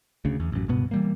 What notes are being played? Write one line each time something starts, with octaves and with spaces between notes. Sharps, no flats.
D2 C#3
E2
A1 F#2
C#2 G2 B2 B3
E3 G3 A#3